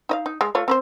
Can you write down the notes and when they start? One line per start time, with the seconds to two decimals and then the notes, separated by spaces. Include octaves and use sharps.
0.09 D#4 D#5 F5
0.26 D#4
0.41 G#3
0.55 A3 F4 C#5
0.68 C4 B4 C5